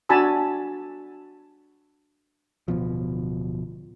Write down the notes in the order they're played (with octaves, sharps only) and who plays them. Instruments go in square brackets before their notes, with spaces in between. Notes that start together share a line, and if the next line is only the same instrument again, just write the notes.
[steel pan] D4 F#4 G#5 A5 B5 E6
[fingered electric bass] D1 B2 F3